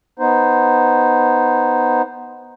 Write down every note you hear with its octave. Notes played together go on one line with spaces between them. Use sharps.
B3 D#4 C5